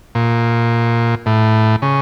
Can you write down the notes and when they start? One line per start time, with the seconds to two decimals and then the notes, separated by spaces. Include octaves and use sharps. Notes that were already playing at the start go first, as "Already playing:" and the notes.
0.15 A#2
1.26 A2
1.82 C#3